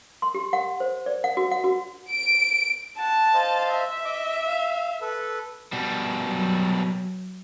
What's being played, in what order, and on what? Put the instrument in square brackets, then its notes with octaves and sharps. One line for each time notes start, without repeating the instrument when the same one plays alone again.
[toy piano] C6
G4
F#5
C5
D5
F#5
F#4
F#5
F#4
[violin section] D7
[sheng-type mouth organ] F#5 [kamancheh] A5
[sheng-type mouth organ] C5 D#5 F5
[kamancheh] E5
[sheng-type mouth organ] D#5 D6
F5
A4 B4
[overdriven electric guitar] B2 G3
[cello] F#3